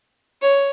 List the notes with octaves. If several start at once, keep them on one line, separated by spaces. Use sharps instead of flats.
C#5